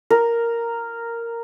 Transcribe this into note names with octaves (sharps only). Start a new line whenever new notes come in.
A#4